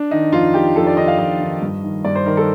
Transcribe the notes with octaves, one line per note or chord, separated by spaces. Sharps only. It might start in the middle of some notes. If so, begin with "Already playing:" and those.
Already playing: D4
D#3 D#4
F2 F4
D#3 G4
F2 A4
D5
D#3 D#5
F5
F2 D#5
D#3
G2
D#3
G2 D5
C5
D#3 A#4
A4